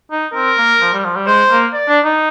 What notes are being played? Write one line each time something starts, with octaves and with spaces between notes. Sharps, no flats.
D#4
C4 A#4
A#3
F3
G3
F3
G3
G#3 C5
A#3
D5
D4
D#4